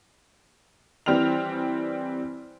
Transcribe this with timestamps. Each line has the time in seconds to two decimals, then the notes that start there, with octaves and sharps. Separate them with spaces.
1.06 E3 G3 C4 F6 F7